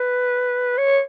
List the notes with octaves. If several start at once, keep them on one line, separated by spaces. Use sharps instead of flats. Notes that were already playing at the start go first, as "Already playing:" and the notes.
Already playing: B4
C#5